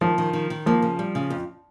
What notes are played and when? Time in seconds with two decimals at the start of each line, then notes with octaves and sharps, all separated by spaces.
0.01 D#3 F3
0.18 D#3
0.33 D#3
0.50 D#3
0.66 F3 A#3
0.82 C#3
0.99 G3
1.15 C#3
1.30 F2